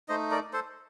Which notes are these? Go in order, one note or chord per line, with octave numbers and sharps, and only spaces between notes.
A3 D#4 C5 D#5
A#4 D5
A4 C5